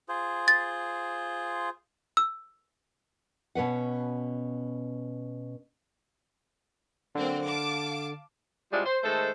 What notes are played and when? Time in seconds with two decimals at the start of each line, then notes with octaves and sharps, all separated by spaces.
0.08 F4 G#4 C5
0.48 A6
2.17 E6
3.55 B2 C#4 B4 F#5
7.15 D3 F#3 A#3 C4
7.46 F5 A5 D6
8.72 C3 G3 G#3 D4 E4 F4
8.86 C5
9.03 D#3 G#3 A3 A4 C5